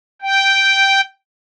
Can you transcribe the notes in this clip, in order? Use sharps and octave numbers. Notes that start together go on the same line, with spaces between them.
G5